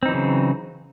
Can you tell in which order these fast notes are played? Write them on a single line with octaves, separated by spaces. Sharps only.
C4 D#4 E3 F#3 C#3